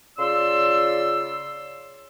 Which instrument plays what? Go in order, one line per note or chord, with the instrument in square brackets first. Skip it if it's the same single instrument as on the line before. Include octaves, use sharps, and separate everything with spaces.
[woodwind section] C#3 F4 D5 C6 E6